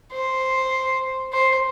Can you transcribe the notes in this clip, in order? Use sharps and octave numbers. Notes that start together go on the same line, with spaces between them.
C5
C5